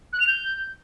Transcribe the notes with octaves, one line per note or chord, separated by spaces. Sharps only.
F#6
F7
G6